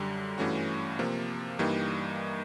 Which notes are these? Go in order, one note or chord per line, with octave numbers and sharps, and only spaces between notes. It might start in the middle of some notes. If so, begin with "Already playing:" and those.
Already playing: F#2 D3 G3
G2 E3 A3 C#4 F#4
C3 F3 A#3
G2 E3 G3 A#3 D#4